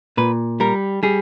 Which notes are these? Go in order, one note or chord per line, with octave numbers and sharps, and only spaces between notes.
A#2 B4
G3 A#4
G3 G#4